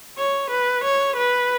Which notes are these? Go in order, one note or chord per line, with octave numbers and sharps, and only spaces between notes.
C#5
B4
C#5
B4